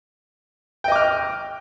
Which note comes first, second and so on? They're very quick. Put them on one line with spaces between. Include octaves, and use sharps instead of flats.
G5 D#5 D6 F6